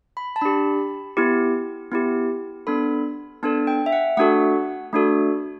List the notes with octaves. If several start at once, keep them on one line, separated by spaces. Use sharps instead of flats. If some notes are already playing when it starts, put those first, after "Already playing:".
B5
A5
D4 G4 B5
B3 E4 G4
B3 E4 G4
B3 D4 A4 B5
B3 D4 A4 A5
G5
E5
F#5
A3 D4 F#4 A4 F#5
A3 D4 F#4 A4